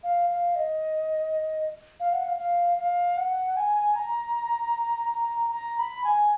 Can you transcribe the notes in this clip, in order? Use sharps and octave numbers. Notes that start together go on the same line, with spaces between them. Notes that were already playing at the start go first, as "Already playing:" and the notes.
F5
F5
D#5
F5
F#5
F5
F5
F5
F#5
G#5
A#5
A#5
B5
G#5